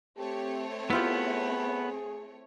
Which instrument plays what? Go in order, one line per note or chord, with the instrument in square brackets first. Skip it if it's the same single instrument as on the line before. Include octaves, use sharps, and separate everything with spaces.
[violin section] A3 C4 C#5 [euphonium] G4
[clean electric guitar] B3 [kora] E4 F4 G4 [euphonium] G#4